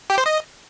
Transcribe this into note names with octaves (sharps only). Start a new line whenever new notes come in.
G4
C5
D#5